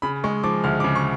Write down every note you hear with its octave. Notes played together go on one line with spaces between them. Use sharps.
C#3 B5
G#3 C#6
F3 D6
D2 F6
D6
C#3
C#6